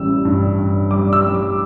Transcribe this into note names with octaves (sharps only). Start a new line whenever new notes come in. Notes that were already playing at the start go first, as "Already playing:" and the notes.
Already playing: A1 G3 E6
G2
G2
G3 D6
E6
G3
D6